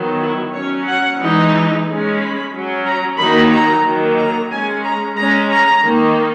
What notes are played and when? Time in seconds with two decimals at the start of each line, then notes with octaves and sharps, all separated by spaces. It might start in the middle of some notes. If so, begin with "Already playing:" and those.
Already playing: D#3 F#3 B3
0.21 E4
0.54 F#3 C#4 C#5
0.87 F#5
1.20 E3 G#3 D#4
1.86 G#3 C#4
2.20 B5
2.53 F#3 C#4
2.86 A#5
3.18 D#3 F#3 A#3 D#4 B5
3.51 A#5
3.84 D#3 F#3 A#3
4.18 A#5
4.50 G#3 C#4 G#5
4.84 A#5
5.17 G#3 C#4 A#5
5.50 A#5
5.83 D#3 A#3 D#4